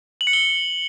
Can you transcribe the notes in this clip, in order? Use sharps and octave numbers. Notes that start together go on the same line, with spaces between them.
F#7
C#7
G7